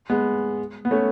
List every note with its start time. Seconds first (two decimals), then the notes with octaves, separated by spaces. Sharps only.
0.10 G#3 B3
0.85 B3
0.91 A3 C#4